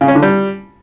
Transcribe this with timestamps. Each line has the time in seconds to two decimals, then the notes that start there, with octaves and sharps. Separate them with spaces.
0.01 C#3
0.08 C#4
0.15 D3
0.23 G3